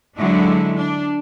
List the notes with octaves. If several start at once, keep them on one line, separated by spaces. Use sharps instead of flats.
D3 F#3 G#3 D4 E4
D4